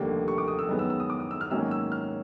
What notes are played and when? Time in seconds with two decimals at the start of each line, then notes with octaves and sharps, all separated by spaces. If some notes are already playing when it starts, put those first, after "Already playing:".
Already playing: F1 D#2 D3 G3 A#3
0.28 C#6
0.38 D6
0.48 D#6
0.59 E6
0.69 F#2 D#3 G#3 B3 D#6
0.79 E6
0.90 E6
1.00 D#6
1.10 D6
1.20 D#6
1.31 E6
1.41 F6
1.51 G#2 D#3 F#3 A#3 C#4 E6
1.71 E6
1.92 F6